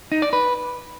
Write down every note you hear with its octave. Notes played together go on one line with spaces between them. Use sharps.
D#4
D5
B4